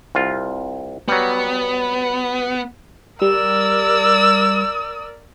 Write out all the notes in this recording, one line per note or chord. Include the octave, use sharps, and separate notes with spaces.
C2 F4
F#3 G3 B3
G3 A#4 D5 E6